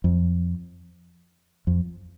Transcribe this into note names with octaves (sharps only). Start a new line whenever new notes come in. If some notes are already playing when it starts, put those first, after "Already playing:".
F2
F2